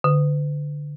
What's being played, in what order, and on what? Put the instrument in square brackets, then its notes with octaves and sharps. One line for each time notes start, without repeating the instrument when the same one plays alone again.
[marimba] D3